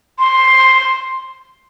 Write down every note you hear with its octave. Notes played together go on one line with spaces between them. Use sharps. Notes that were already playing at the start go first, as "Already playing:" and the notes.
C6